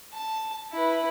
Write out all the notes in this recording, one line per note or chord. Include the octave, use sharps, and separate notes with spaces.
A5
E4 B4